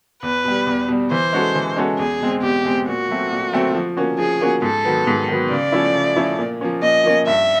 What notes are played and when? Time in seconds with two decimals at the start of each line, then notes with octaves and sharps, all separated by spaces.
0.23 E2 B4
0.44 B2 G3
0.67 E2
0.88 B2 G3
1.11 E3 C5
1.33 G#3 C#4 F#4 A4
1.55 E3
1.76 G#3 C#4 F#4 A4
1.99 E2 G#4
2.20 B2 G#3 C4
2.42 E2 G4
2.64 B2 G#3 C4
2.87 A#2 F#4
3.09 F#3 A3 C4
3.31 A#2
3.52 F#3 A3 C4
3.75 F3
3.97 A#3 C#4 F#4
4.18 F3 G#4
4.41 A#3 C#4 F#4
4.62 G#2 A4
4.85 D#3 F#3 B3
5.07 G#2
5.28 D#3 F#3 B3
5.50 C#3 D5
5.72 F3 A3 C#4 E4
5.95 C#3
6.16 F3 A3 C#4 E4
6.39 A#2
6.61 F3 A#3 C#4
6.82 A#2 D#5
7.04 F3 A#3 C#4
7.26 G2 E5